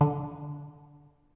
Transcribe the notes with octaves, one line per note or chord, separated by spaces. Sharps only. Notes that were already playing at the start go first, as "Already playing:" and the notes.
D3